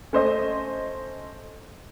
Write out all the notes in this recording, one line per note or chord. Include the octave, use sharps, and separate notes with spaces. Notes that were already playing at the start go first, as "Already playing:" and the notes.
A3 C#4 C5 D#5